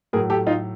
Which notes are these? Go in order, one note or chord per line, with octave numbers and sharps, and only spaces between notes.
A2 F#3 G#4 A#4
G4 A4
D#4 F4